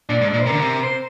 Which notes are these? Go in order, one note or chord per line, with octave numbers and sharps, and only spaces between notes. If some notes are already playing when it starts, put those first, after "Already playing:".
A#2 D4
G#2
D4
A#2
C5
C3 A#4
D3
C3
C5